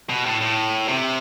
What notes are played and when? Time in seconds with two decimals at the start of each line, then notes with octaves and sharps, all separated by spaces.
0.10 B2
0.26 A2
0.41 A2
0.88 C3